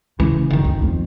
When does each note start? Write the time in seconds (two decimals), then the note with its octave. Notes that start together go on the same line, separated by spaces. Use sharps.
0.20 C#3 E3
0.50 F#1 D#3
0.64 D2
0.82 F2